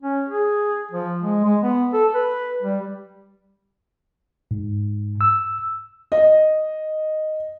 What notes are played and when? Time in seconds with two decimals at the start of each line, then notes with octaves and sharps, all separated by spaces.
0.02 C#4
0.29 G#4
0.92 F3
1.22 G#3
1.44 G#3
1.63 B3
1.93 A4
2.15 B4
2.63 G3
4.51 G#2
5.21 E6
6.12 D#5